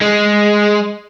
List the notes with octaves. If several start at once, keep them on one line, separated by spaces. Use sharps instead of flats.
G#3